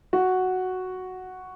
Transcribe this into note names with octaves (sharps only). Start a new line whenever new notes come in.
F#4